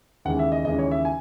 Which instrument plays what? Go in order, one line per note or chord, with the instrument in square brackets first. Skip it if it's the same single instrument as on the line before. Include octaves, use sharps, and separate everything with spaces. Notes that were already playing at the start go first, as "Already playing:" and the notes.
[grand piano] D#2 C#3 E3 G#3 F#5
E5
D#5
D#2 C#3 E3 G#3 D#5
C#5
E5
G#5